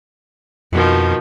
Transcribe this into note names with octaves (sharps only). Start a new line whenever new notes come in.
F2 B2 D#3 F3